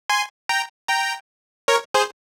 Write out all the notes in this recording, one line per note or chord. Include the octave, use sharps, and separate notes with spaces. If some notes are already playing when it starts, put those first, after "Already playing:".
G#5 C6
G5 A#5
G5 A#5
A#4 C#5
G#4 C5